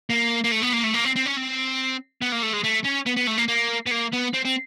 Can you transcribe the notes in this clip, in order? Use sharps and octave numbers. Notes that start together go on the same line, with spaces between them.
A#3
A#3
A3
B3
A#3
A3
A#3
C4
C4
C#4
C4
B3
A#3
A3
G#3
A3
C#4
B3
B3
A3
A#3
A#3
B3
A#3
B3
C4
C4